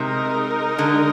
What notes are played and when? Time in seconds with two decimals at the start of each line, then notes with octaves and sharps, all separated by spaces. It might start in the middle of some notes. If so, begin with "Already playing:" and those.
Already playing: C3 G#3 D#4 A#4
0.78 D3